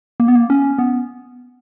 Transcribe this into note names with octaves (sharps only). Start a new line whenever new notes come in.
A#3
B3
A#3
C#4
B3